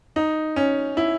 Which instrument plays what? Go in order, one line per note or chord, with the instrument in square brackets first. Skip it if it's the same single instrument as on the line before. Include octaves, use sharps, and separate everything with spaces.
[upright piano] D#4
C#4
E4